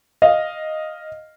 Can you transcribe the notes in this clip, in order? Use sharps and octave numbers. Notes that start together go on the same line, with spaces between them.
D#5 F5